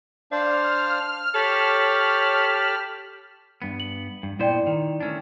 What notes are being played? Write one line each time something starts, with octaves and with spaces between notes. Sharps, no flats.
D4 C5 D5 F5 F6
G4 A4 C#5 A5 B5
G2 B3
F#7
G2
A#2 B3 E4 C5 D5 G5
D#3
A3 C#4 D4